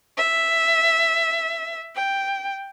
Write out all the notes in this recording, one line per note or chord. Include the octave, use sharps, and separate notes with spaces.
E5
G5